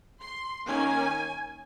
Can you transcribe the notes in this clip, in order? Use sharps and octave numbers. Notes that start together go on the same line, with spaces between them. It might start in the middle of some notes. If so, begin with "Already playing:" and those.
C6
D#3 A#3 C#4 G#5